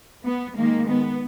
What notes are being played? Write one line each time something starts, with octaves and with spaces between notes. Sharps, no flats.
B3
D#3 G#3 A#3
B3